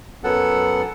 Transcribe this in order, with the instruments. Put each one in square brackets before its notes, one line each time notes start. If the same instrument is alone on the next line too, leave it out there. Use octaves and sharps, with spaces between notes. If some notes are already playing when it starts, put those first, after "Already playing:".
[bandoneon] F#2 F#3 B3 A4 F#5